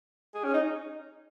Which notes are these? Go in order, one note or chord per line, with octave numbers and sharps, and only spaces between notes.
G#4
C#4
D#4